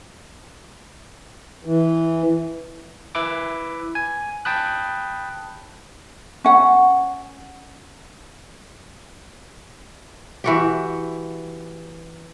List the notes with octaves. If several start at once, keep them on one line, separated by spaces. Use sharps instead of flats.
E3
E4 B4 E5 B5 D6
G#5
G5 A5 B5 D#6 F#6
C#4 F#5
E3 F#4 G4